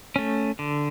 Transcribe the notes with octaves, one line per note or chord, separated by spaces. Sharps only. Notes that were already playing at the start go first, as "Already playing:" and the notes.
A3 C#4
D3